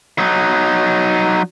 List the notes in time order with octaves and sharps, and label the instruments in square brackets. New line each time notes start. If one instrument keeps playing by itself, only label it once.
[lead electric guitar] F#3 D#4